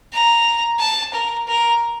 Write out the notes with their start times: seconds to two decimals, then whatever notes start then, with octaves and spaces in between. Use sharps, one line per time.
0.13 A#5
0.79 A5
1.13 A#4
1.47 A#4